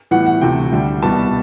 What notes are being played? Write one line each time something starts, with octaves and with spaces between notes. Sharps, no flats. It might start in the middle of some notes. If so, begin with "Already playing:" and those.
A2 E3 G3 B3 F#5
F#5
D2 C3 E3 A3 G5
D2 D3 G3
C2 B2 G3 B3 A5